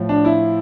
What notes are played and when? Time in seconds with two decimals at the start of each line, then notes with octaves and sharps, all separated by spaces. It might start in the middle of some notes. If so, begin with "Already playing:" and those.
Already playing: A2 F3
0.09 D4
0.25 E4